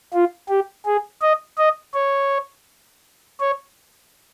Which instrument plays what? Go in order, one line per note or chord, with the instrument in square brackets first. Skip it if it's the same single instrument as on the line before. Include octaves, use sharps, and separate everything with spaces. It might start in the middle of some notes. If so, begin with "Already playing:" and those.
[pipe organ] F4
G4
G#4
D#5
D#5
C#5
C#5